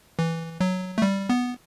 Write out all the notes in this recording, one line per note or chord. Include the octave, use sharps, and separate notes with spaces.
E3
F#3
A3
G3
B3